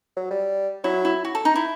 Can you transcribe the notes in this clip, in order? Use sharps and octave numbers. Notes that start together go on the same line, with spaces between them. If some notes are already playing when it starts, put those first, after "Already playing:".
F#3
G3
F#3 E4
E4
F#4
A4
D#4
E4